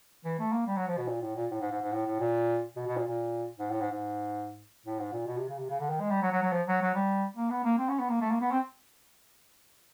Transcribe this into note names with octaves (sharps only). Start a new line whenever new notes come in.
E3
A3
A#3
G3
F#3
F3
B2
A#2
A2
A#2
A2
G#2
G#2
G#2
A2
A2
A#2
B2
B2
A#2
A#2
G#2
A2
G#2
G#2
A2
G#2
A#2
B2
C3
C#3
C3
C#3
D3
D#3
G#3
G3
F#3
F#3
F#3
F3
F#3
F#3
G3
A#3
B3
A#3
C4
C#4
B3
A#3
A3
A#3
B3
C4